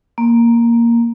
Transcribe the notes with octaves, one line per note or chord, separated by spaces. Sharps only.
A#3